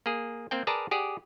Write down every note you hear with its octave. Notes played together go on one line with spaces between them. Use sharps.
A#3 G#4
A#3 C4 G5
G#4 A#4 B4 D5 A5 A#5
G4 G#4 D5 F#5